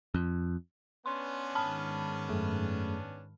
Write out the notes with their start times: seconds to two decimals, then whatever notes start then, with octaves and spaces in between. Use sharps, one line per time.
0.14 F2
1.06 B3 C#4 D4 C6
1.55 G#2 D#3 A5 B5 F6
2.29 F#2 A3 G#4